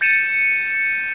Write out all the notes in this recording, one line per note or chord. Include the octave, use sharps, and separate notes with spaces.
G6 A6 C#7 D#7 E7